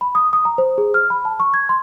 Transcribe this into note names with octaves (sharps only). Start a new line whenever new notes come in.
B5
D#6
D#6
A#5
C5
G#4
F6
B5
A5
C#6
G#6
C6